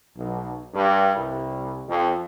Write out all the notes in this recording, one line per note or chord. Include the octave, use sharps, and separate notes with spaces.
B1
G2
C2
F2